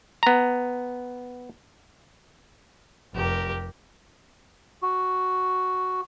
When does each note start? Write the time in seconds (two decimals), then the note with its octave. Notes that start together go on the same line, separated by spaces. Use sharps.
0.23 B3 A#5
3.15 F1 G4 A#4
4.83 F#4